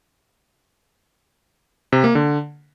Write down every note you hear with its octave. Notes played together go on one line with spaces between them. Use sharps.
C3
A#3
D3